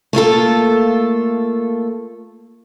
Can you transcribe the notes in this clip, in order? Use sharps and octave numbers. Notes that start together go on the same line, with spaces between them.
A3 A#3 F4 A4